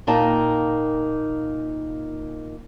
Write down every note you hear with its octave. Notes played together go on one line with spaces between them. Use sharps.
A#2 A#3 D#4 G5 A5